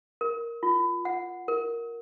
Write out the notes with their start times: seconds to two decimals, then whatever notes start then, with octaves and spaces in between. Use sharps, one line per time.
0.21 A#4
0.63 F4
1.05 F#5
1.48 A#4